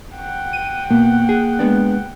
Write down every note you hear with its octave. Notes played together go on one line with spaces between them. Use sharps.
F#5 G5
D#7
B2 A#3
G#4
G#3 B3 D4